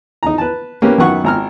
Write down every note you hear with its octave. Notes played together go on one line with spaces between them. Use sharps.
D#4 A#5
B4 A5
A#3 C#4 G4 B4
F#2 D#3 B3 F#5 C#6
G#1 A#5 F6